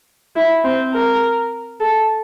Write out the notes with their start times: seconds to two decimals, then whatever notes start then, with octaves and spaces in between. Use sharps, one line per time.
0.36 E4
0.64 C4
0.94 A#4
1.80 A4